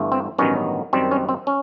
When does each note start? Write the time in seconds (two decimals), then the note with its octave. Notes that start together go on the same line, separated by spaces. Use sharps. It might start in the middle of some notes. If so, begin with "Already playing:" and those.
Already playing: G1 G2 E3 A3
0.12 C4
0.38 A1 G2 D#3 F#3 B3 C#4
0.93 F#2 D#3 G3 C4
1.11 C#4
1.29 C4
1.47 C#4